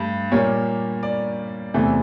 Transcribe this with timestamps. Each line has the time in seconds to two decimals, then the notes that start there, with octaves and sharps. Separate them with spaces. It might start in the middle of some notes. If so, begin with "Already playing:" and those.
Already playing: G2 A3
0.31 A#2 G3 A#3 C#5
1.03 D5
1.74 E2 C3 E3 A3